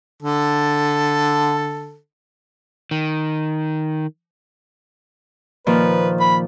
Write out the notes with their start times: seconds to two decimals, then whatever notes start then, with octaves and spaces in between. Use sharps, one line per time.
0.23 D3 A4
2.91 D#3
5.66 A#2 D#3 F3 B4
6.20 B5